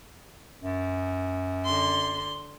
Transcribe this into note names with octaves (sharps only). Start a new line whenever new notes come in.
F#2
D3 C6